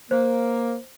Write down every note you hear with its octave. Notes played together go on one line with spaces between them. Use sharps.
A#3 C5